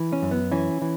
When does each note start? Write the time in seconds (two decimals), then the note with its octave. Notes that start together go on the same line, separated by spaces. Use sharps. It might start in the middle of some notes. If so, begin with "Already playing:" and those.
Already playing: E3
0.13 C#4
0.22 F#2
0.31 B3
0.51 E3 C#4
0.82 E3